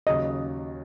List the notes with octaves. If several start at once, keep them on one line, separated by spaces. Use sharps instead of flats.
D#2 C#3 F#3 D#5